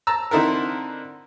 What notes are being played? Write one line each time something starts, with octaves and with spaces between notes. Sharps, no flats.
A5 A#5 E6
D3 C4 D#4 E4 A4 A#4